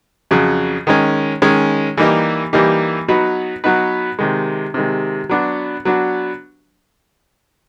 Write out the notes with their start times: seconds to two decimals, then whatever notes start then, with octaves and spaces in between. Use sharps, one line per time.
0.31 F2 C#3 F#3
0.87 D#3 G#3 C#4
1.42 D#3 G#3 C#4
1.97 E3 G3 A#3 D#4 G4
2.53 E3 G3 A#3 D#4 G4
3.08 F#3 B3 D#4 F#4 B4
3.64 F#3 B3 D#4 F#4 B4
4.19 C3 D#3 G#3
4.74 C3 D#3 G#3
5.29 F#3 B3 D4 F#4
5.85 F#3 B3 D4 F#4